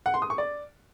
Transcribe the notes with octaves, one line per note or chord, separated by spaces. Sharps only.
F#5
C6
D#6
C#6
D5